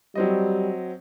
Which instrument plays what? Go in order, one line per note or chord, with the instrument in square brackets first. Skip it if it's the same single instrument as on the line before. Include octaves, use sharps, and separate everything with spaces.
[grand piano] F#3 C4 D#5 [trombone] G3